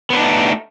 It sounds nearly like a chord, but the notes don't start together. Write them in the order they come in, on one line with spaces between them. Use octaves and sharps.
B3 C5 D4 D#4 A3